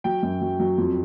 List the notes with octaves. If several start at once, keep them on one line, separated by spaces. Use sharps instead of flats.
F#3 G5
F#2
F#3
F#3
F2